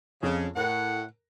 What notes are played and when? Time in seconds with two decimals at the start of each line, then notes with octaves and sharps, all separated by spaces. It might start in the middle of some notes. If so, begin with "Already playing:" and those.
0.23 F2 C#3
0.56 A2 A#4 F#5